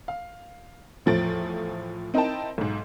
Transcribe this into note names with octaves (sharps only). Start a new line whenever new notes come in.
F5
E2 A2 F3 A3 A6 D7
C4 D#4 E4 A#4 G5 A5
B1 G#2